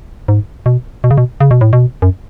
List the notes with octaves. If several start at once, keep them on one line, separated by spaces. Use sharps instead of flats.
G#2
B2
B2
C#3
B2
C#3
B2
A2
B2
F#2